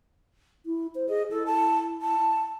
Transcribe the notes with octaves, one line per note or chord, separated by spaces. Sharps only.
E4
C5
G#4 D#5
E4 A4
A5
A5